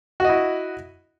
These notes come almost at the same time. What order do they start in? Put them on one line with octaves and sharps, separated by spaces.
F#4 D#5 E4